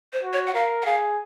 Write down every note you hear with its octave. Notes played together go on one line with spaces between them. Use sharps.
C5
F#4
C#5
F#5
A#4 F5
F#5
G#4 F5